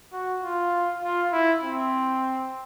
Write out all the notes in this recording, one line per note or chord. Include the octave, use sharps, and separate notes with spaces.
F#4
F4
F4
E4
C4